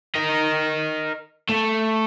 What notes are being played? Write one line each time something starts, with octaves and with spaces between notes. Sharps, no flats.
A#4 D#5
A3